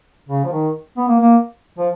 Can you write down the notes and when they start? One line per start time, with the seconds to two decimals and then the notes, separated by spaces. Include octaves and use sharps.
0.29 C#3
0.45 F3
0.52 D#3
0.97 B3
1.08 A#3
1.20 A#3
1.78 F3